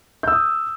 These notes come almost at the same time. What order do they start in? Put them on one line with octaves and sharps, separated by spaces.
G6 E6 D#6